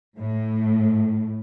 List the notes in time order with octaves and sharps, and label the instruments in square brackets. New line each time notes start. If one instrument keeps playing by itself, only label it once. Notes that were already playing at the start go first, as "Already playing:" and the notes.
[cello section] A2